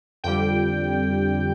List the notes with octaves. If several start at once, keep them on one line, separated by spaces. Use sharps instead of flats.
F2 D3 G3 G5